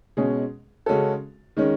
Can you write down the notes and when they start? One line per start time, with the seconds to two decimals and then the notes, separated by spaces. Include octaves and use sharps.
0.17 B2 G#3 C#4 G#4
0.86 C#3 G#3 C#4 F#4 A4
1.57 D#3 G#3 C#4